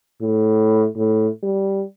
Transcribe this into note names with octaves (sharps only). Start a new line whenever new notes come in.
A2
A2
G3